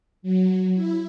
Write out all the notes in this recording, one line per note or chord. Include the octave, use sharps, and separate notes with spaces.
F#3
E4